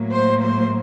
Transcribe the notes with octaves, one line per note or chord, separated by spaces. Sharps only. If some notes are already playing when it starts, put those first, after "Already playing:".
Already playing: A2 F#3 A#3
C5
C5